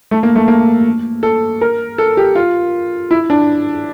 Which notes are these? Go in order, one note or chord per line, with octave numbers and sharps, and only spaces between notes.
A3
A#3
A3
A#3
A4
A#4
A4
G4
F4
E4
D4